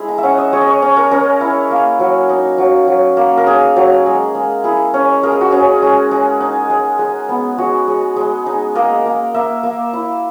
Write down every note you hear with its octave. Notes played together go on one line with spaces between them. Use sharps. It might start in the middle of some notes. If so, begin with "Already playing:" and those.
Already playing: G#3 E4 G#5
A#5
E5
C#4 F#5
D#5
G#3 C#5
D#5
C#5
C#4 C#5
A#4
C#4 A#4
E4
A#3
F#3
D#4
F#3
F#3
A#3
A#4
D#4 G#4
F#3
G#3
G#3
E4 G#4
C#4
G#3 A#4
G#4
F#4
C#4 G#4
G#3
G#3
D#4
G#3
G#3
B3
G#3 F#4
G#3
G#3
D#4
A#3 D#5
A#3
A#3 E5
A#3
E4